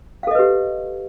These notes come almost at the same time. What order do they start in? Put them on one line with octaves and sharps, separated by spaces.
F5 A4 D#5 B4 G4